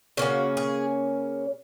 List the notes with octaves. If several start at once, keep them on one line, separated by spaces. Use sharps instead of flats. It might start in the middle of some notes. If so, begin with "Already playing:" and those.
C#3 A#3 C#4 F#4
G#4